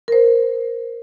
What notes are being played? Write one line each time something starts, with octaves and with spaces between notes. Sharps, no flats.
A#4 C5